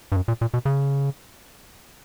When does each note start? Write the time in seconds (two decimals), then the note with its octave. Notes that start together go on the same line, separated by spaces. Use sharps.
0.12 G2
0.16 F#2
0.28 A#2
0.41 A#2
0.54 B2
0.65 C#3